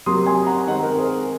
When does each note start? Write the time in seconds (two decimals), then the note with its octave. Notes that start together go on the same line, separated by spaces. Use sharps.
0.06 C3 F#3 A#3 C6 D#6
0.26 G#5 C6
0.47 F#5 A#5
0.67 D#3 G#3 C4 D#5 F#5
0.83 A#4
0.98 G#4 C5